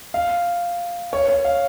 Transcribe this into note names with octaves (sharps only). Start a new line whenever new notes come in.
F5
C#5
C#5
F5